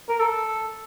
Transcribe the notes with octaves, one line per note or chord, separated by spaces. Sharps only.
A#4
A4